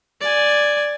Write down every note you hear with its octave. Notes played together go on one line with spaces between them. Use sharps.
D5 G#5